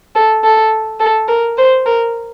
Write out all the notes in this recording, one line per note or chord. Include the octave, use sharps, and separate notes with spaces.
A4
A4
A4
A#4
C5
A#4